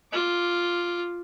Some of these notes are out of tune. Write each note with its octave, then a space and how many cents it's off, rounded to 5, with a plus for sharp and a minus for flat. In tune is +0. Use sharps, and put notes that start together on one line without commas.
F4 +0 D6 +0